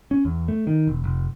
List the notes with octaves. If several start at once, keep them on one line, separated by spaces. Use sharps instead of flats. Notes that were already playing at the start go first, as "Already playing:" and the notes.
C#4
E2
A3
D#3
E1
F1